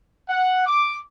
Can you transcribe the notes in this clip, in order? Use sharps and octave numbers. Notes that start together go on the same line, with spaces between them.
F#5
D6